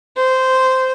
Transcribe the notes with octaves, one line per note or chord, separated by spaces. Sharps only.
C5